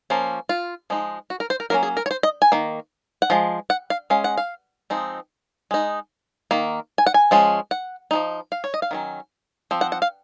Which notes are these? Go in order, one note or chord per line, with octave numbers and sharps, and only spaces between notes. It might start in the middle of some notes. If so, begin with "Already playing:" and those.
F3 A#3 C#4
F4
F3 G#3 D#4
F#4
A#4
C5
A#4
F#3 A#3 C#4 A#4
G#4
A#4
C#5
C5
D#5
G#5
D#3 A#3
F#5
F3 G#3
F#5
F5
G#3 C#4 F5
F#5
F5
F3 G#3 C4 D#4
G#3 D#4
D#3 A#3
G#5
F#5
G#5
F3 G#3 C#4
F#5
F3 G#3 D#4
F5
C#5
D#5
F5
D#3 F#3 C#4
F3 C4
F#5
F#5
F5